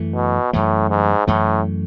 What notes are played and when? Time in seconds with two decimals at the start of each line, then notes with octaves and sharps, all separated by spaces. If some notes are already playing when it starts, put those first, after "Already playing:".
Already playing: F#2 E3 A3
0.15 B2
0.53 F#2 A2 E3 A3
0.90 G#2
1.27 F#2 A2 E3 A3